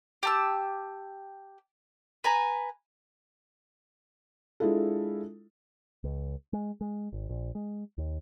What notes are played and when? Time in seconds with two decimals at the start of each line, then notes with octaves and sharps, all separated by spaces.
0.23 G4 A5 E6
2.24 B4 G#5 A#5
4.60 G#3 D4 E4 F4 A4
6.04 C#2
6.53 G#3
6.81 G#3
7.13 G#1
7.29 A#1
7.55 G#3
7.98 D#2